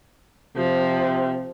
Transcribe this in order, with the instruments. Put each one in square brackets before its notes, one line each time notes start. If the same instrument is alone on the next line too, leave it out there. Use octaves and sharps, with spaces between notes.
[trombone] C3 [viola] F3